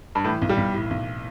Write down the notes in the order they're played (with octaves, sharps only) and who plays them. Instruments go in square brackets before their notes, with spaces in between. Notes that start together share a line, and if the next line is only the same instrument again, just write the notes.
[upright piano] G2
[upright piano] A2 [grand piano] E3
[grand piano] B1
[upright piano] G3
[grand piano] B1
A2
B1